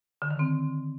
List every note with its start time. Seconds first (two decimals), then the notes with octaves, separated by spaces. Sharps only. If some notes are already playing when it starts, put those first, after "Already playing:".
0.22 D3
0.31 D#3
0.39 C4